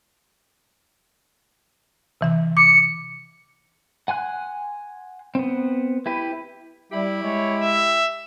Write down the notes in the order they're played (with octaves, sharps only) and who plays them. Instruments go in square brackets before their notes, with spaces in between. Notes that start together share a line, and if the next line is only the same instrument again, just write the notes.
[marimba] C3 E3 E5
[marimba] D6 [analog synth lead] C#7
[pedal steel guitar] F#5 G#5 C6 F#6
B3 C4
E4 G4 B4
[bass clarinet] G3 [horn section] E4 G4
[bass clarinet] G#3 [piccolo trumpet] C#5
[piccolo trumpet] E5